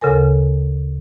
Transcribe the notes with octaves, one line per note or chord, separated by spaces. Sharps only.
D2 C#3 A4 A#4 G#5